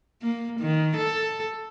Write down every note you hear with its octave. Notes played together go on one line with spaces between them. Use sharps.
A#3
D#3
A4